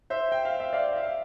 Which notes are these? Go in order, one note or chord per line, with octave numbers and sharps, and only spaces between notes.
C5 E5
G5
F5
E5
D5 F5
E5
F5